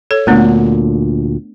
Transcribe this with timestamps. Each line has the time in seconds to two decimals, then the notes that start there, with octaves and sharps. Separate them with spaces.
0.11 A4 C#5
0.27 D2 A#2 A3 B3 D4